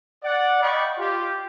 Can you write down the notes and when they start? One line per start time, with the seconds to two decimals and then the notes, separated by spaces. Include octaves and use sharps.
0.24 D5 F#5
0.62 D5 D#5 F5 G5 B5 C#6
0.99 F4 G4